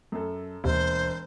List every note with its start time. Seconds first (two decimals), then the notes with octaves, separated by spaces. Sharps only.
0.12 F#2 A4
0.64 E1 D#2 C5